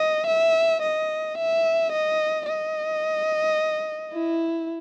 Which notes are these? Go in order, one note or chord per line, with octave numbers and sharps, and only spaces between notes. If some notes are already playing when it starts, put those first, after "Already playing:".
Already playing: D#5
E5
D#5
E5
D#5
D#5
E4